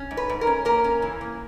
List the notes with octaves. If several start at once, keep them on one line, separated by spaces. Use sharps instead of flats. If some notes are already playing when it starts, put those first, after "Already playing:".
Already playing: C#4
G#2
B4
G#2
A#4
C#4
A#3 A#4
C#4
E3
A#3